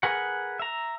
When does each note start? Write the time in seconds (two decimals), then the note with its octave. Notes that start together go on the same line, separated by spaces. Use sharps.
0.03 G#4 A#4 B4 F#5
0.59 E5 A#5